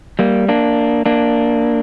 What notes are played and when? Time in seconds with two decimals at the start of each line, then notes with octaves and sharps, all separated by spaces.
0.19 G3 A#3
0.48 A#3 D4
1.06 A#3 D4